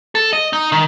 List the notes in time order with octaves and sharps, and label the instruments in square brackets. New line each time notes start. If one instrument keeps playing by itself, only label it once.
[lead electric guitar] A4
D#5
D#4
D#3